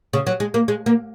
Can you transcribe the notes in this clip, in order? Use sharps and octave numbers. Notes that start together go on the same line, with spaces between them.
C#3
F#3
G#3
A#3
G#3
A#3